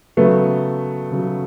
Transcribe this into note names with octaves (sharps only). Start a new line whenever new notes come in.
C#3 F#3 A3 B3
C#3 F#3